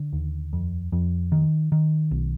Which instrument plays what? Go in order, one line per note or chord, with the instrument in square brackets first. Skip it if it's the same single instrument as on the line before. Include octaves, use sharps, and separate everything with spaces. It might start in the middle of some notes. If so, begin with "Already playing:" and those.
Already playing: [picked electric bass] D3
D#2
F2
F2
D#3
D#3
B1